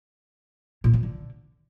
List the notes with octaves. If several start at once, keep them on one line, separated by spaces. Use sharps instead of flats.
A#2
C#3
D3